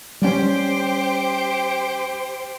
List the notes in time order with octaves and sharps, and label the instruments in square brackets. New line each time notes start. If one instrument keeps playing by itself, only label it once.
[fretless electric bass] G3 C#4 [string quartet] G4 C5